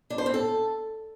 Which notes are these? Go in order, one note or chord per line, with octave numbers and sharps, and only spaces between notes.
D4
C5
C4
A4